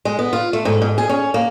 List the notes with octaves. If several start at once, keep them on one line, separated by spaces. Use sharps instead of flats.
G#3
B3
F4
A3
G#2
G#2
G#4
C#4
A#3